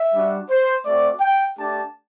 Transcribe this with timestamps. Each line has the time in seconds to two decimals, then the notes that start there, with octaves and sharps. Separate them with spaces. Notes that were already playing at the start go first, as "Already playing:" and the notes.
Already playing: E5
0.14 G3 D4 F#4
0.49 C5
0.85 A3 C4 F#4 D5
1.20 G5
1.57 A3 D4 G4 A5